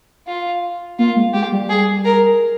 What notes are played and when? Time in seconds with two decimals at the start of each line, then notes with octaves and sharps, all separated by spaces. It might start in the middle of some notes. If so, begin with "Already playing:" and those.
0.27 F4
0.99 A#3 F4
1.16 G#3
1.33 G#3 G4
1.52 G3
1.70 G#4
2.05 A#4